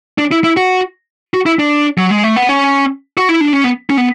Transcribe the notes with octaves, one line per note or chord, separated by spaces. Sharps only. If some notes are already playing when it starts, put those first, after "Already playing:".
D4
E4
E4
F#4
F#4
E4
D4
F#3
G#3
A3
B3
C#4
F#4
E4
D4
C#4
B3
C#4
B3